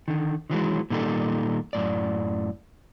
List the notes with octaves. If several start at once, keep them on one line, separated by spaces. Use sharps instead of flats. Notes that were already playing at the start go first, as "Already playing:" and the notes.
D3 D#3
D#3 E3 F#3 G#3
A#2 D#3 G3 D#4 A4
F#2 A2 D5